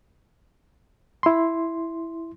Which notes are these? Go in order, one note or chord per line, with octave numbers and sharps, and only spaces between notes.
E4 C6